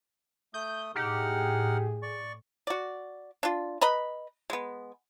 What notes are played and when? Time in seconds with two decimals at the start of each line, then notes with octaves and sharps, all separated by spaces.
0.54 A3 D#6 G6
0.96 A2 D#4 G4 G#4 F#5 F6
2.03 D5 C#6
2.67 F#4 D5
3.43 D4 F4
3.81 B4 D#5 A#5 B5
4.50 G#3 B3